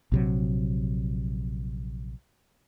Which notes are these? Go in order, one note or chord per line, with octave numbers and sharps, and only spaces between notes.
A#1 C3 F#3